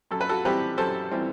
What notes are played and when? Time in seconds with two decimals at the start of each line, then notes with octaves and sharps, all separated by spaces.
0.11 F#2 A4
0.21 B4
0.29 F#4 A4
0.45 E3 G3 C4 G4 B4
0.78 F#2 A4 C5
1.11 E3 G3 C4